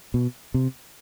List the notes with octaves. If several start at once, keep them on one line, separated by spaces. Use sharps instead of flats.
B2
C3